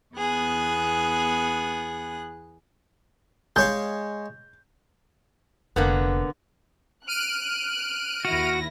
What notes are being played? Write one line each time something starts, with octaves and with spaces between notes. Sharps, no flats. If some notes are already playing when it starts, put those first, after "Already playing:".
E2 B3 G#4 F#6
G#3 C#5 F5 G6
F1 D3 A#3 B3
F6 F#6 D7 D#7
D#2 E4 F#4 A#6